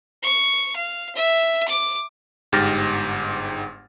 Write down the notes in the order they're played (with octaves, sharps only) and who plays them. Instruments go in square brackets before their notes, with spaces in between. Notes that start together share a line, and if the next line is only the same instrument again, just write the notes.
[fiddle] C#6
F5
E5
D6
[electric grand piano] G1 G#2 G4 F6 A6 A#6